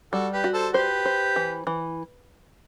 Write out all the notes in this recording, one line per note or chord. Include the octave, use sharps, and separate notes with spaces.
G3 F#4 A4
G4 B4
F#4
A4 C5
G4 B4 C5
C5
E3
E3